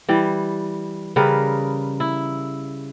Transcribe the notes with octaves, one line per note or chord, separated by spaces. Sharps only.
E3 G3
C#3 G3 A#4 B4
E4